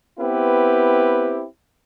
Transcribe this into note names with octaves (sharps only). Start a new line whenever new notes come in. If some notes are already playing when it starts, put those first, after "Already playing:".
B3 C4 E4 G4 B4